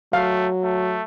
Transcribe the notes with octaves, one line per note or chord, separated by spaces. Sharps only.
F#3 A3 F5
A3